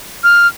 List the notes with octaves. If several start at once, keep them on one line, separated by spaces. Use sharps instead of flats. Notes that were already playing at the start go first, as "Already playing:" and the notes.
F6